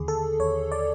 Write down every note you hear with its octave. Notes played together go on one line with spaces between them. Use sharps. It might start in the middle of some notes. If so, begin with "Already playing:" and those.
Already playing: D#2 D3 G#4
A4
D#2 C#5
D5